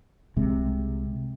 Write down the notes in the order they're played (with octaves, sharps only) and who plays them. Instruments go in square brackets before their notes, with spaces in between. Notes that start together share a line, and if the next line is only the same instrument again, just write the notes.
[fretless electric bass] C2 C3 G#3